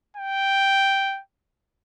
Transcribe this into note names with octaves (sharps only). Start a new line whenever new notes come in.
G5